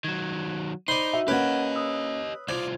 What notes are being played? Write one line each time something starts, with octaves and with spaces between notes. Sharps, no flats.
D#3 F#3 G#6
D#4 C5 D5 B5 C6 G6 F#7
F#4 E5
A#3 C#4 G4 B4 D#5 F#5 G#6 D7
C#5 D#6 E6
C2 F4 C5 D5 G#6